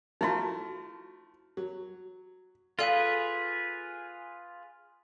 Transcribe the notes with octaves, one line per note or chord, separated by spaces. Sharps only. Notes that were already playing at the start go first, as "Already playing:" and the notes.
F3 A3 D#4 E4 F#4
F#3
F4 G#4 A4 B4 D5 F5